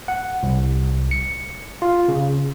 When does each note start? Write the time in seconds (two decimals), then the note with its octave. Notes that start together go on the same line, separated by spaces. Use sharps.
0.08 F#5
0.43 C2
1.11 C#7
1.82 F4
2.08 C#3